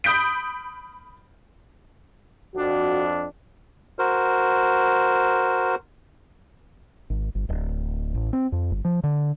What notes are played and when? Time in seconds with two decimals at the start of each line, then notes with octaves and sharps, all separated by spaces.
0.04 B5 D#6 G6 B6 D7
2.55 F2 D4 F#4
3.99 F#4 A#4 C5
7.10 G#1
7.35 G1
7.49 D1
8.15 A1
8.33 C4
8.52 F2
8.71 G1
8.85 F3
9.04 D3